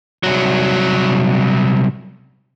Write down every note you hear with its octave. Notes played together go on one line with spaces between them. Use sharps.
C2 F#3